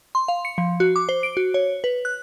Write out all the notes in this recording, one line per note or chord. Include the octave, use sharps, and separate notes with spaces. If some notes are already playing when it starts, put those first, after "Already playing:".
C6
F5
C#7
F3
F#4
D6
C5
D7
F#4
C#5
B4
F#6